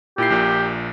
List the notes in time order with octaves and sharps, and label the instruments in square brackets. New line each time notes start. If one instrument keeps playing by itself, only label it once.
[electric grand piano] A#2 E4 C7 [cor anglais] G4
[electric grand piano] A#1 A#2